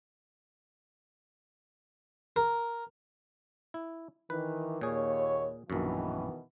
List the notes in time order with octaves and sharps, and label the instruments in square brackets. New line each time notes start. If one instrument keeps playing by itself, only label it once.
[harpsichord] A#4
[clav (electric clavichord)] E4
[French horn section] D#3 E3 [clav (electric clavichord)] B4
[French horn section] D#2 C#5 [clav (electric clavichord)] A#2 G#4
[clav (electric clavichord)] A#1 F#2 [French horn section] B2 D#3 E3